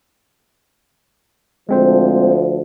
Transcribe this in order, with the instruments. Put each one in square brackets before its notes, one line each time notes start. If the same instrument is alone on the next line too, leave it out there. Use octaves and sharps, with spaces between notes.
[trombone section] D2 F3 [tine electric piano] G#3 C4 C5